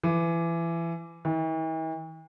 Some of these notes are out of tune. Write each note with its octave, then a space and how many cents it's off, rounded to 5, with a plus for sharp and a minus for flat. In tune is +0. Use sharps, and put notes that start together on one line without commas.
E3 +25
E3 -45